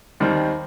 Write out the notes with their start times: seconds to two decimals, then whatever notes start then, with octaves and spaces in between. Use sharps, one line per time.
0.20 D#2 D#3 G3 C4